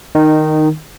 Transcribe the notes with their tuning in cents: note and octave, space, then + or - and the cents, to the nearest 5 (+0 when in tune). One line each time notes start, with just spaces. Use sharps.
D#3 -5 D#4 -20